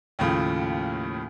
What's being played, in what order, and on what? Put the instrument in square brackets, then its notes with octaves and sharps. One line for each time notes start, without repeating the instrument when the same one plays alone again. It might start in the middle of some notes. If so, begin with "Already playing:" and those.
[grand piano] D#2 A2 C#3 F3